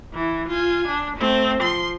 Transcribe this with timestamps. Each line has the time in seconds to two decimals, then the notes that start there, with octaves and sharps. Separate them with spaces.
0.14 E3
0.49 F4 G#5
0.88 D4
1.17 A3 C4
1.60 F3 C6